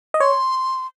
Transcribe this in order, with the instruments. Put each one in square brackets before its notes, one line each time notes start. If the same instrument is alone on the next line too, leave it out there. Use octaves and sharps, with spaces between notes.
[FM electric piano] D#5
[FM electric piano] C#5 [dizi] C6